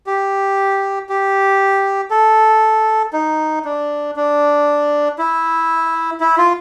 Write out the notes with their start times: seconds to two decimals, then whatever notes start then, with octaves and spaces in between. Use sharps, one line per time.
0.07 G4
1.09 G4
2.10 A4
3.13 D#4
3.65 D4
4.16 D4
5.18 E4
6.20 E4
6.38 F4